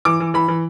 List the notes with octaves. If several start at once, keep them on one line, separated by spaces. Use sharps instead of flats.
E3 D6
E3
E3 B5
E3